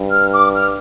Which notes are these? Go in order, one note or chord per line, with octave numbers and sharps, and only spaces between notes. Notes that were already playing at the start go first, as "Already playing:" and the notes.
Already playing: G2
F6
D6
F6